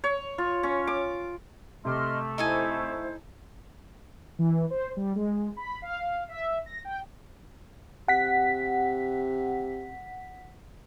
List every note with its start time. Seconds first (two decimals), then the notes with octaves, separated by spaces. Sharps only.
0.04 C#5
0.38 F4
0.63 C#4
0.87 D6
1.85 C3 A3 D#5 C6 D6 F6
2.38 D#4 E4 A4 C5 G#5
4.39 E3
4.70 C5
4.97 G3
5.16 G#3
5.57 B5
5.82 F5
6.29 E5
6.66 A#6
6.85 G5
8.08 C3 F#5 B6